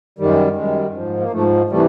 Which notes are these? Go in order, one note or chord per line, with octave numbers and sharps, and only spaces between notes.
F#2 D#3 G3
F#2 D#3 G3 G#3
G#2 F3
A#3
G#2 F3 A3
C3 E3 G3 A3